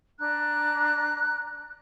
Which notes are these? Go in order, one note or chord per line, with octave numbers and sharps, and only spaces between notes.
D4 A#5 F#6